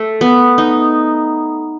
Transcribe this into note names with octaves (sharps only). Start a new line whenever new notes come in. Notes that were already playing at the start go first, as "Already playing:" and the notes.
Already playing: A3
B3
D#4